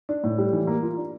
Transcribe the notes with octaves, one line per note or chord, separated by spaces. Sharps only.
D4
A2
G3
E3
A#3
F4
D4